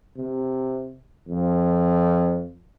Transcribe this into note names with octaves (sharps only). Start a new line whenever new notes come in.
C3
F2